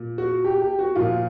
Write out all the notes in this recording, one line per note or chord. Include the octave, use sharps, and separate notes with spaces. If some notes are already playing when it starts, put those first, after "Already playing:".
Already playing: A#2
F#4
G4
G4
F#4
A#2 F3 F4